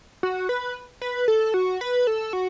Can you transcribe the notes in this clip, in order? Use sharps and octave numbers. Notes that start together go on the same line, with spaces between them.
F#4
B4
B4
A4
F#4
B4
A4
F#4